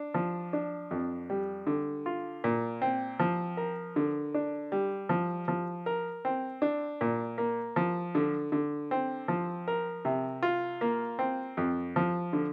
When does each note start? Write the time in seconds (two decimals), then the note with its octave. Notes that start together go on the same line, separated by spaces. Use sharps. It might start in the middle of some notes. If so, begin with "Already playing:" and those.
Already playing: D4
0.14 F3
0.53 D4
0.91 F2
1.30 G3
1.67 D3
2.06 F4
2.44 A#2
2.82 C4
3.20 F3
3.57 A#4
3.96 D3
4.34 D4
4.72 G3
5.09 F3
5.48 F3
5.86 A#4
6.25 C4
6.62 D4
7.01 A#2
7.38 A#3
7.76 F3
8.15 D3
8.52 D3
8.91 C4
9.28 F3
9.68 A#4
10.05 C3
10.43 F4
10.81 A#3
11.19 C4
11.57 F2
11.96 F3
12.33 D3